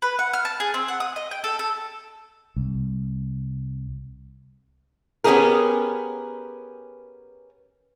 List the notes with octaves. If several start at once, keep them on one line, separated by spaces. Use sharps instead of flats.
B4
F#5
F6
A5
G#4
C4
F#5
D#6
D#5
G5
A4
A4
C2
B3 C#4 E4 G4 G#4 A#4